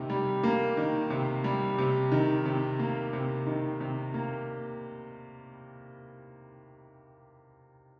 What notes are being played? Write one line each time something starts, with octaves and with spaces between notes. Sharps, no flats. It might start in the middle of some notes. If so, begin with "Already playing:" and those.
Already playing: C3 D#3 A#3
G3
A#3
D#3
C3
G3
C3
D#3
C3
A#3
C3
D#3
C3
A#3